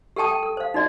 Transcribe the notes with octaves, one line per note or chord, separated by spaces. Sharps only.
G4 A4 G5 A5 D#6
G5 A5
A4
C5 F5
D#4 F#4 D5 D#5